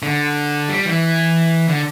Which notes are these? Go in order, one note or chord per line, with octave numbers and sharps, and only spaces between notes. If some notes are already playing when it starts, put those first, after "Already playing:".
D3
G3
E3
D3